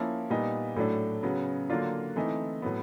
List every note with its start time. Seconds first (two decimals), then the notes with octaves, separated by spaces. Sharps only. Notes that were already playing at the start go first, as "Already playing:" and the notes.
Already playing: F3 A#3 C#4 E4
0.30 A#2 G3 B3 D#4
0.76 A2 F#3 A3 D4
1.23 C#3 F#3 B3
1.70 D3 F#3 A#3 D4 F4
2.16 E3 A3 C4 D#4
2.62 A2 F#3 B3